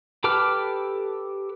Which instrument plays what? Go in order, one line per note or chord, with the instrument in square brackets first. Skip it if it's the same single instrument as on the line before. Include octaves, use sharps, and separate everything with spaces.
[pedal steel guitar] G4 A4 B4 D6 F6